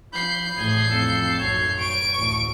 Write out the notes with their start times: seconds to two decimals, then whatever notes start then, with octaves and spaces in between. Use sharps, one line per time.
0.13 F3 B5 G6 C7
0.57 A1 A2 G#4
0.90 F2 A4
1.39 B1 F#2 C#5
1.78 C#6 D7
2.18 A1 D2